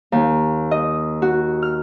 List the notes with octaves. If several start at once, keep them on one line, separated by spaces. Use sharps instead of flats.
D#2
D#5
F#4
F6